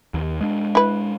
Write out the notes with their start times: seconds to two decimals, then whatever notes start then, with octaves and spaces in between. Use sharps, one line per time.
0.14 D#2
0.41 G#3 D4
0.75 E4 B4